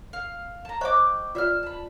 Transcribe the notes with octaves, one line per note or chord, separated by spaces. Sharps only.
F5
A5 A#5
C5 D#5 G5 A#5 C#6 D6
F4 D5 E5 E6 F6
A5 B5